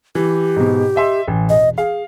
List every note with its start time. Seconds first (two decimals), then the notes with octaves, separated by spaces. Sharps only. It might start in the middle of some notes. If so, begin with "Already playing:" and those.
0.15 E3 G4
0.56 G#2 B2
0.96 D#5 E5 C6
1.28 A1
1.49 E1 D#5
1.78 G#4 F5